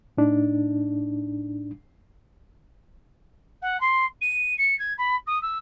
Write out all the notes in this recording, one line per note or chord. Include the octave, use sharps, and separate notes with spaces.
A2 D4 D#4
F#5
C6
D#7
C#7
G#6
B5
D#6
E6